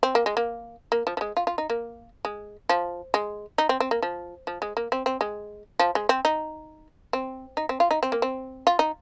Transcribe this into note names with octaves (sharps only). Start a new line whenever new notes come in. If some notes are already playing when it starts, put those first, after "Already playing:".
C4
A#3
G#3
A#3
A#3
F3
F3
G#3
F4
F4
D#4
A#3
G#3
F3
G#3
D#4
C4
C4
A#3
F3
F3
G#3
A#3
C4
C4
G#3
F3
G#3
C4
D#4
C4
D#4
C4
F4
D#4
C4
A#3
C4
F4
D#4